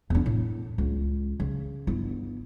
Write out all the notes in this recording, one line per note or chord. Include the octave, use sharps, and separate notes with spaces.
E2 D4
A2
C#2
C#3
G1 E4